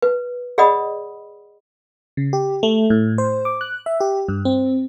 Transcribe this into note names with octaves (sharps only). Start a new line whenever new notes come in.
B4
G#4 D5 D#5 F#5 B5 D#6
C#3
G4
A3
A2
C5
D6
F#6
E5
G4
G2
C4